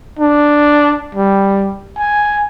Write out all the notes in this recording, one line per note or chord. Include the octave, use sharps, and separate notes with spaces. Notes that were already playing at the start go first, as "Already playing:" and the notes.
D4
G3
G#5